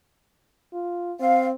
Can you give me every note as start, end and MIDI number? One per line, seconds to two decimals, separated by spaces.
0.73 1.13 65
1.20 1.53 60
1.20 1.46 77